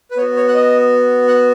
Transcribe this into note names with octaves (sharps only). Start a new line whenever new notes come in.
B4
B3 F#4 C#5
C#5
F#5
D#5
F#5